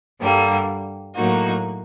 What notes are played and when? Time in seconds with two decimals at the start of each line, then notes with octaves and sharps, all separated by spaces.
0.20 G2 D3 G3 A#3
1.15 A2 F#3 A#3 D#4 F#4